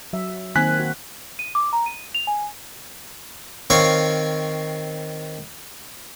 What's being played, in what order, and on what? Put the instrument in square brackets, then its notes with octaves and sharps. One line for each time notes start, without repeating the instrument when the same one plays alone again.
[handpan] F#3 E5
[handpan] D#3 A#3 C4 [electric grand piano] G#5 F#6 B6
[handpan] F#4
[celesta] D#7
D6
A#5
D#7
F7
G#5
[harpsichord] D#3 C4 C#5 F5 C#6